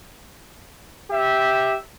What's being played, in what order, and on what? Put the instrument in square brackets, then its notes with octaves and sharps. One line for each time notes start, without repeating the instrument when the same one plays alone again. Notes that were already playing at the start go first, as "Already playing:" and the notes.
[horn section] G4 E5